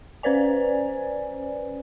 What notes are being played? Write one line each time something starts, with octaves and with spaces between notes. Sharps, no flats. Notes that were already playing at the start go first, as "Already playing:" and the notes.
C#4 B4 C5 D5 G#5